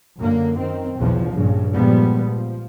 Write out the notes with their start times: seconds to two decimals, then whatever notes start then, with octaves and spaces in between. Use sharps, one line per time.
0.18 F#2 D3 A#3
0.58 D#3 C4
0.99 B1 E2 C#3 F3
1.33 A#1 G2 C#3
1.73 A#2 F3 G3 G#3 B3
2.25 F3